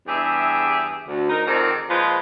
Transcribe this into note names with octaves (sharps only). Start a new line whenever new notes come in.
E2 G2 G4 G#4 E5
D2
D#4 A#4
F2 G#2 D#3 C4 A#4 D5
A#2 F3 G#3 F4 B4 C5